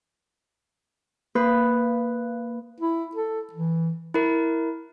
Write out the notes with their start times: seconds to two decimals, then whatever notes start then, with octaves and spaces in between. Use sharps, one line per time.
1.35 A#3 B4
2.81 E4
3.15 A4
3.53 E3
4.14 E4 A#4